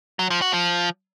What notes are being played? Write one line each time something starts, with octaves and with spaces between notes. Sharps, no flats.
F#3
F3
F#4
F3